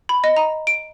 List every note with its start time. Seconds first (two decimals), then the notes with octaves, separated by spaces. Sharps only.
0.09 B5
0.24 D#5
0.37 A#5
0.67 D7